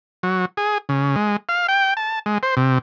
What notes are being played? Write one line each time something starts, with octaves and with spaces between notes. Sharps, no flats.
F#3
G#4
C#3
G#3
F5
G5
A5
G#3
C5
C3